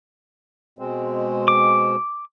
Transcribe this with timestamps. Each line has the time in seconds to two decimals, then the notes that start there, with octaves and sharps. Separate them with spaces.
0.79 B2 G#3 C4
1.48 D6